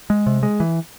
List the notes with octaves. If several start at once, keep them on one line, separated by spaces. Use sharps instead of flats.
G#3
C3
G#3
E3